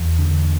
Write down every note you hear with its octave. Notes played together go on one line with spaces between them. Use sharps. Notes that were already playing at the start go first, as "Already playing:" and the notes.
Already playing: E2
D3